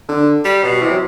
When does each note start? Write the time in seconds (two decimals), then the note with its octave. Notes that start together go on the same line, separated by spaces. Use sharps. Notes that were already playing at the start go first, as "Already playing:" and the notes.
0.09 D3
0.45 G3
0.64 B2
0.81 C3 E3
0.89 F#3